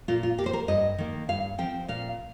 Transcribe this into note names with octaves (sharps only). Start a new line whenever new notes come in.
A#2 F4
F4
A#3 G4
C5
A#4
G2 D#5
D#3 A#3
G2 F5
F3 C4 G5
A#2 F5